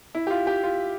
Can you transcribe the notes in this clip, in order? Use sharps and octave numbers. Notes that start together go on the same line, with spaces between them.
E4
G4
F4
G4
F4